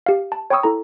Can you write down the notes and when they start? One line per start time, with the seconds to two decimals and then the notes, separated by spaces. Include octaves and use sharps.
0.06 G4 F5
0.32 A5
0.50 C#5 G5 B5 C#6 D#6 E6
0.63 E4 A4 A#5